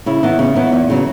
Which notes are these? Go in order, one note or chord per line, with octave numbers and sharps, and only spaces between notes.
C#3 E4
E3 B3 D#4
C#3
E3 B3 D#4
E2
C#3 F#3